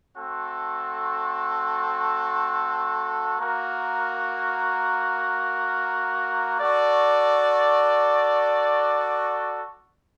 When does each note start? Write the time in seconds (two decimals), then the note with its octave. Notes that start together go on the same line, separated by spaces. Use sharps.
0.17 A3 C4 F#4 A4
3.38 A#3 F#4 A#4
6.59 F#4 A4 D5